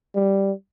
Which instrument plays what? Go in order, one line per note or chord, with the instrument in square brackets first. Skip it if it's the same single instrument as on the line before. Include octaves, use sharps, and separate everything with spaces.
[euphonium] G3